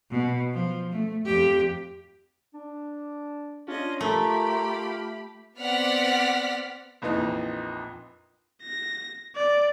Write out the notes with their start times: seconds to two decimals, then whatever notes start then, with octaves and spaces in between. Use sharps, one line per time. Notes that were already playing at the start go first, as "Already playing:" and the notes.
0.11 B2
0.53 F3
0.92 A3
1.26 F2 G4
2.54 D4
3.68 C#4 D4 F4 D#5
4.01 A3 G4 A#4 B5
5.58 B3 C4 D5 F#5 F6 B6
7.02 A#1 F2 E3 D#4
8.62 A#6
9.36 D5